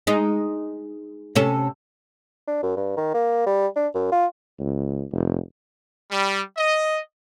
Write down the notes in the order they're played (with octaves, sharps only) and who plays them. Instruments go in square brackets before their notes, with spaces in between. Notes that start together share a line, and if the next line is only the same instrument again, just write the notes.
[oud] G#3 D#4
C3 C#4 A4
[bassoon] D4
F#2
G2
D#3
A#3
G3
D4
F#2
F4
[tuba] C#2
F1
[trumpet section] G3
D#5